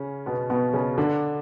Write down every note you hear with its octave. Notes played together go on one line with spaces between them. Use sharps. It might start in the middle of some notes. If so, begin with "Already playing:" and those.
Already playing: C#3 C#4
B2 B3
B2 B3
C#3 C#4
D3 D4